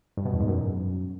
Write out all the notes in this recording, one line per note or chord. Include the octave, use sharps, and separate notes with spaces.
G2
B2
E2
G#2
F#2